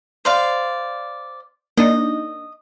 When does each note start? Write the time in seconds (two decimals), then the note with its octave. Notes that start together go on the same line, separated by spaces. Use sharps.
0.25 C5 D5 F5
1.77 A#3 D4 D#4 D#5